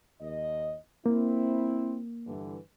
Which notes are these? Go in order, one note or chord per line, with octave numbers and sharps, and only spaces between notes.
D#2 D#5
A#3 C4 E4
G2 D3 E3